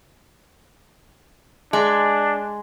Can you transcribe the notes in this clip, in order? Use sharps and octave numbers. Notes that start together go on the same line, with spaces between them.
G#3 D4